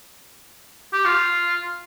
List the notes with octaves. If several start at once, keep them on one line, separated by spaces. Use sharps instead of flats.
G4
F4